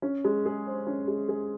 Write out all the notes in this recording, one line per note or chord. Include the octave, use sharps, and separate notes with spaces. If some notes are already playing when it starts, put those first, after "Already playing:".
C#4
G#3
G#4
C5
C#4
G#3
G#4